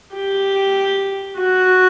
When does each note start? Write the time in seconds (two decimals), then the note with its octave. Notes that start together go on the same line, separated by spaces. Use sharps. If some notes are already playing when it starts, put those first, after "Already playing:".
0.16 G4
1.38 F#4